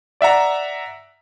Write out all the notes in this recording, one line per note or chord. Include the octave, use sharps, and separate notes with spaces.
D5 E5 F#5 A#5